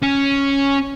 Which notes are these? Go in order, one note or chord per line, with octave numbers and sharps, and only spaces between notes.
C#4